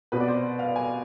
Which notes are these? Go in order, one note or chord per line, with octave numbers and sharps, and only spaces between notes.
C2 B2 B3 B4
D5
C5
F5
G#5